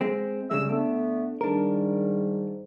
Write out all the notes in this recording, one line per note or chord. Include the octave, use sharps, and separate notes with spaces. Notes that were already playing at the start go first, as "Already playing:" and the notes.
G#3 C4
C#3 G3 G#3 E6
D3 A3 B3 D4
G#2 D#3 G3 D4 A#4